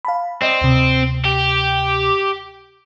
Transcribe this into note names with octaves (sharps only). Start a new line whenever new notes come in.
F5 A5 B5
C4 D5 D#5
D2 C3
G4